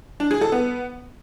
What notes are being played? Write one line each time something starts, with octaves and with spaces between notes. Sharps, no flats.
D4
G#4
A4
B3